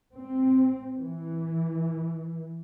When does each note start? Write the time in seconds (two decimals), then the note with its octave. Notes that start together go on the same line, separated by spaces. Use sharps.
0.15 C4
0.98 E3